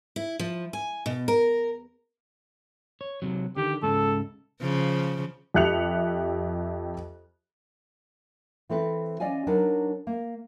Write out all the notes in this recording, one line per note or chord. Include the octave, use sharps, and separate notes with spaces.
E4
F3
G#5
B2
A#4
C#5
C3 F#3
D3 D#3 G4
C#2 G#2 C#3 A4
C#3 F3
F2 G4 E5 F#6 C#7 F7
E3 C4 A4 B4
C#4 D5 D#5 F5 G#5
F#3 D4 D#4 A#4 B4
A#3